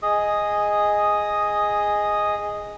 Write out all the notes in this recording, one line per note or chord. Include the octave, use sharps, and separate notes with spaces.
G#4 D#5 D#6